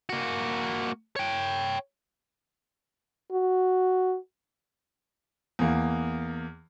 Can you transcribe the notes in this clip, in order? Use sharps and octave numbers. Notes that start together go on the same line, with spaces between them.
A#3 F#4
C#5 G5
F#4
E2 A#3